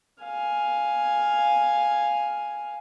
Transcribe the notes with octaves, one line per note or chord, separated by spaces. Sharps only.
F5 G#5